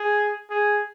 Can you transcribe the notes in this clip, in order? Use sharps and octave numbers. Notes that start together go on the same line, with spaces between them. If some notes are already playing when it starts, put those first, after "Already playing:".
Already playing: G#4
G#4